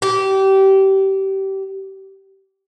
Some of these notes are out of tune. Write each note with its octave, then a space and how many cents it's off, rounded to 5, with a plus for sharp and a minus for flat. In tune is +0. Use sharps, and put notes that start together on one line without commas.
G4 -25